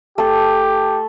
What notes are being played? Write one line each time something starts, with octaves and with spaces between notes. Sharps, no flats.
A3 G4 A4